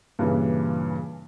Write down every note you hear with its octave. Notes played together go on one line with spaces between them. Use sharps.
G2 A#2 C#3 E3